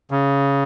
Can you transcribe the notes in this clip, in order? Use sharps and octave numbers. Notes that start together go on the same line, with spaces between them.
C#3